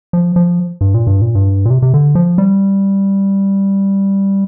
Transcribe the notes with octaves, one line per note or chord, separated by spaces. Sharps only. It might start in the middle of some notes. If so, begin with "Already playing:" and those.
F3
F3
G2
A#2
G2
A#2
G2
A#2
C3
C3
D3
F3
G3